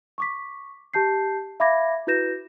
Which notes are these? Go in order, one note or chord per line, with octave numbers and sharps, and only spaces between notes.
C#6 D6 B6
G4 A5 G6 C7
E5 F5 B5 D6 G#6 A#6
E4 F#4 B4 G6 A#6 E7